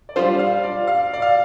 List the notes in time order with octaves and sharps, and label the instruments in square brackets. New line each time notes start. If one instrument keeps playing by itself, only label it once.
[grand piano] D5
[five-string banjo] G3 D4 F4 C5 [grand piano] F5
[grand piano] F5
D5
F5
D5
F5